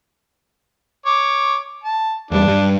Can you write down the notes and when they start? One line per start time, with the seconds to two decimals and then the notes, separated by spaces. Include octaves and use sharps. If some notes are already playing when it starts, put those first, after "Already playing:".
1.06 C#5 D6
1.84 A5
2.31 E2 G3 D4
2.44 G2 G3